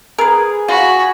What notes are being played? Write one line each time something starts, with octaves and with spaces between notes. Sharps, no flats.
G#4 A#4 B4
F4 F#4 B5